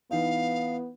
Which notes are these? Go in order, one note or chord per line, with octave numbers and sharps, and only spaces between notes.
E3 B3 D#4 F5